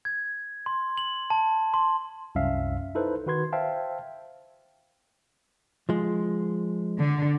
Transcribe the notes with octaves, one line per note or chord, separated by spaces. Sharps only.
G#6
C6
F#7
A5
C6
C2 F#2 C#4 E5 F5
D#4 E4 A4 B4 C5
D#3 F#4 B4 C6 G#6
C5 E5 F5 G5 A5
F3 G#3
D3